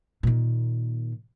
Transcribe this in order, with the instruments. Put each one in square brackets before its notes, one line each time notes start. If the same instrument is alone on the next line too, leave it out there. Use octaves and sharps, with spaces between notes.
[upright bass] A#2 D#3